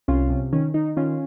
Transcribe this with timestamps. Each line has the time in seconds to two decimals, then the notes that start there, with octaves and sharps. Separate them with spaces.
0.08 C2 C#4 F4
0.30 C3
0.53 D#3 C#4
0.74 D#3 D#4
0.97 D#3 C#4 F4